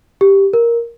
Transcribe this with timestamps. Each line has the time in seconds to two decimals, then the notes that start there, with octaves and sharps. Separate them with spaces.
0.21 G4
0.53 A#4